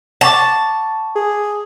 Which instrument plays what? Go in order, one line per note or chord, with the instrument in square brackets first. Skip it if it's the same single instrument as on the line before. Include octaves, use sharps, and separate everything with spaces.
[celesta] F#5 C#6 D6 [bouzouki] A5
[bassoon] G#4